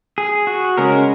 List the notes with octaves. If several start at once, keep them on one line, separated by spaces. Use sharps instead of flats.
G#4
F#4
C#3 G#3 C#4 A#4